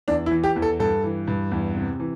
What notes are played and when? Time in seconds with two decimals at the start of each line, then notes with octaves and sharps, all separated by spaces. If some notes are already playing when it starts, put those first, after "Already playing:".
0.08 E2 D4
0.26 E4
0.31 E3
0.44 G4
0.56 E2
0.62 A4
0.79 G2 A4
1.04 E3
1.27 G2
1.51 E2
1.76 C3
2.00 E3